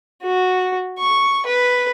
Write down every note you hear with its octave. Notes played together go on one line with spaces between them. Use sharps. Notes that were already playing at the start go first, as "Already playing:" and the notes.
F#4
C#6
B4